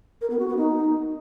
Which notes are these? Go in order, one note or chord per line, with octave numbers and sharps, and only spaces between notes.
A#4
B3
F#4
B3
D#4